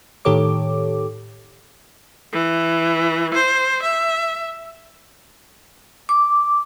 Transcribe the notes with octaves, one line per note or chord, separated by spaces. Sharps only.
A2 D#3 G4 A4 C#5 D6
E3
C5
E5
D6